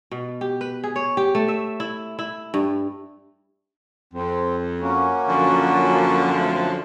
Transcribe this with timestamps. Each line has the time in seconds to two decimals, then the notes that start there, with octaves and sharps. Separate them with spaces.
0.11 B2
0.41 G4
0.61 B4
0.84 G#4
0.96 C#5
1.17 G4
1.35 A3
1.48 E5
1.80 E4
2.19 E4
2.54 G2
4.13 F2 C4
4.80 A#3 C#4 F#4
5.29 F#2 D3 F3
6.37 A3 C4